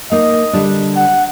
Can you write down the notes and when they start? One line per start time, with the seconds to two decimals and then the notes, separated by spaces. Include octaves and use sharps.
0.12 A#3 D#4 D#5
0.53 D3 G3 D4
0.96 F#5